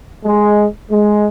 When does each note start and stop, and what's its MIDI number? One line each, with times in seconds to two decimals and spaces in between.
0.24 0.65 56
0.89 1.27 56